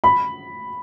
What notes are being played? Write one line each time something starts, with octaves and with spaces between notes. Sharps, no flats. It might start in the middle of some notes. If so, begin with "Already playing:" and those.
B5